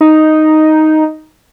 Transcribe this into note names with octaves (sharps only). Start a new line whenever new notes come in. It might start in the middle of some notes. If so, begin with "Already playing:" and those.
D#4